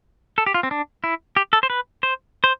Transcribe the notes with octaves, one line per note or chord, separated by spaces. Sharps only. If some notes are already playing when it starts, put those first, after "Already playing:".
A4
G4
F4
C4
D4
E4
G4
A4
C5
B4
C5
C5